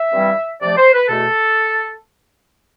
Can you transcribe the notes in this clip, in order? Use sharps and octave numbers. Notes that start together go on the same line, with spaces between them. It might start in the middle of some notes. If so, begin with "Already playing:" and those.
Already playing: E5
G2 E3 G3 C4 E4
C3 F3 A3 D5
C5
B4
E2 B2 A3 A4